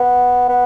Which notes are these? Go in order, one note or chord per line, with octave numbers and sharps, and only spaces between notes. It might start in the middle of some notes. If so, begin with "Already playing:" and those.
Already playing: B3
B3